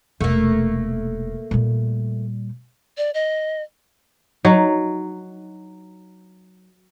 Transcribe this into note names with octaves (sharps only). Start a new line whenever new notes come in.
E1 C3 A3 A#3
A#2 G3
D5
D#5
F#3 D#4